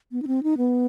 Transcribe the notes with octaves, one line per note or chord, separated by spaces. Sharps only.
B3
D#4
C4
D#4
B3